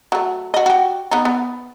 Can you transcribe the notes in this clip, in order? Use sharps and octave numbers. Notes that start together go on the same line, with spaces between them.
F#3 A3
F#4 D#5
F#4 G4
B3 D#4
B3